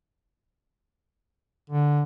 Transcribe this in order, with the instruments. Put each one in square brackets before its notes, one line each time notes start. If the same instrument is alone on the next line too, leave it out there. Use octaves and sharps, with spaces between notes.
[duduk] D3